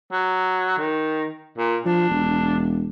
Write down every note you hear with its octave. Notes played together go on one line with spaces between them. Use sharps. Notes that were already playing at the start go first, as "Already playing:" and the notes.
F#3
D#3
A#2
F3 D4
E1